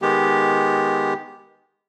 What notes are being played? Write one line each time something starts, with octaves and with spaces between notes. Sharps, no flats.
D#3 G#3 B3 G4